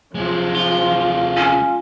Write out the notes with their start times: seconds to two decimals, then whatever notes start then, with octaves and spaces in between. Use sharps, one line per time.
0.15 C3 F3 G#3
0.55 F4
1.37 C#4